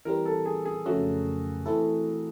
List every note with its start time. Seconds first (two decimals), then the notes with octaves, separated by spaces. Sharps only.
0.05 E3 G3 C4 A#4
0.26 A4
0.46 G#4
0.65 G#4
0.86 F2 C#3 F#3 A3 C#4 F#4
1.66 E3 A3 C4 E4 A4